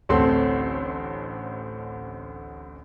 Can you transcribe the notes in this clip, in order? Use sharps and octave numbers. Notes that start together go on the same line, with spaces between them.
A1 D2 C4 A4 C6